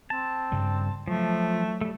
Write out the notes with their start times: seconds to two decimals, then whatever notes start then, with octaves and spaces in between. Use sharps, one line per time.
0.10 C4 A5
0.52 G2 C#3 G3
1.08 F3 F#3 A3
1.81 G3 A3